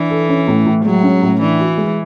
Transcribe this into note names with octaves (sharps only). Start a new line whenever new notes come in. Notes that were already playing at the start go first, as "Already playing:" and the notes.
Already playing: E3 D4
A4
C#4
A2
A2
F#3 G#3
C#4
A2
E3 D4
F#4
G#3